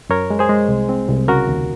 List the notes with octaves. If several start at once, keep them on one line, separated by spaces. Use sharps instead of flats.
F#2 A#4 C#5
G#3
G#4 C5
G#3
C2
C4
C2
C#3 F#4 A#4
D#2